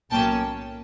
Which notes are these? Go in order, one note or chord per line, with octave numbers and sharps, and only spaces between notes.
B1 A2 F#3 A#3 C#4 G5 A5